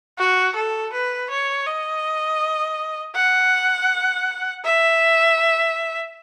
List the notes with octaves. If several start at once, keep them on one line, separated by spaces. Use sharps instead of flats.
F#4
A4
B4
C#5
D#5
F#5
E5